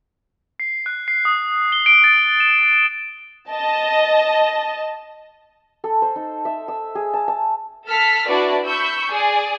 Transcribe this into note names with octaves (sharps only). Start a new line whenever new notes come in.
C7
F#6
C7
D#6
G7
D7
A6
E7
D#5 A5
A4
C5
D#4
E5
E6
G#4
A5
A5
A4 F6 B6
D4 E4 F#4 B4 D5
B5 C#6 E6 G6
G#4 D5